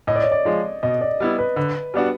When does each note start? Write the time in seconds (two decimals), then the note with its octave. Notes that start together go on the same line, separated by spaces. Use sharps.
0.07 A2 D#5
0.16 D5
0.24 C#5
0.31 D5
0.45 F3 G#3
0.83 B2 D#5
1.01 D5
1.20 G3 B3 E4
1.38 B4
1.56 D3 B4
1.94 G3 B3 D4 F#4